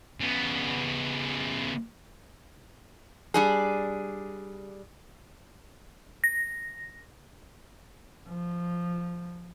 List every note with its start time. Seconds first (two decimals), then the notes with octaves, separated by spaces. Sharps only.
0.20 C#3 B3
3.34 G3 D4 G#4
6.24 A#6
8.28 F3